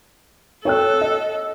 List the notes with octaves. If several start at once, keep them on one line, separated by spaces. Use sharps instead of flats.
A4 C#5 G5 F#6
D#5